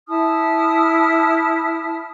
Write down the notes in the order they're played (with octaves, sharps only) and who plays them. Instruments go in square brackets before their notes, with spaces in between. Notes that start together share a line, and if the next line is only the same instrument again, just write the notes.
[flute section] E4 A5 D#6 F6